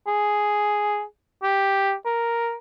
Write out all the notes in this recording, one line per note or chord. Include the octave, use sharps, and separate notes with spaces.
G#4
G4
A#4